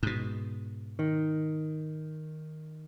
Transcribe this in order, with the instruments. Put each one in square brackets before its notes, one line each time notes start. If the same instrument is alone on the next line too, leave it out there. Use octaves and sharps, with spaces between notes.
[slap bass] G#2 B2
[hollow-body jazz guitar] D#3